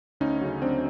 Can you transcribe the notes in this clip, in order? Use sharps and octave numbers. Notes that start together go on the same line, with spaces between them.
D2 C#4 D#4
C#3 F#3
D2 C4 D4